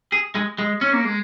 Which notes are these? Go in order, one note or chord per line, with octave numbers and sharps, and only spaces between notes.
G#4
G#3
G#3
C#4
A#3
G#3